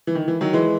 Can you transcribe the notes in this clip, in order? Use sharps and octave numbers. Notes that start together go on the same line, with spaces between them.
E3
D#3
E3
D#3 F#3
E3 G#3